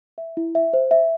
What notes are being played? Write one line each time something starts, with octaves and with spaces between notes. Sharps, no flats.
E5
E4
E5
C5
E5